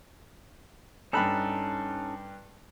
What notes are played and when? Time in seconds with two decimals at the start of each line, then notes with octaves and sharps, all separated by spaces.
1.13 G2 C#4 D#4 A4 B5 F#6